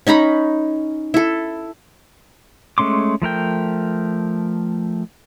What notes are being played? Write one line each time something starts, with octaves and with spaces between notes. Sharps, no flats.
C#4 D#4 A#5 B5
E4 A4
G#3 A3 C#4 C6 D6
F3 A3 A#4 G5